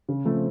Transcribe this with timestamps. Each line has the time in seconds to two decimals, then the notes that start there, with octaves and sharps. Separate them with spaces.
0.08 C#3
0.25 F3 A3 C4